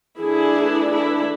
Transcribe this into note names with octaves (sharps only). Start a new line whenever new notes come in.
E3 A3 D4 E4 G#4
E4